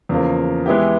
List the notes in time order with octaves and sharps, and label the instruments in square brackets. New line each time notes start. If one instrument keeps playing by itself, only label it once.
[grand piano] E2 C#3 F3 A#3
E3 G#3 B3 E4 G4